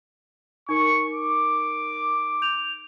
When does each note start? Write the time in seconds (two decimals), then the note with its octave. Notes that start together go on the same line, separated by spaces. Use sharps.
0.69 D#4 A#4 C#6
1.13 D6
2.42 G6 F7